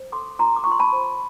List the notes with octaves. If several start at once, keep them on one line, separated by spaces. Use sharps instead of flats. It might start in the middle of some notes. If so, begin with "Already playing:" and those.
Already playing: C5
A4 C6 D6
F4 A#5 C6
D6
C#6
F4 C6
A5 B5
C5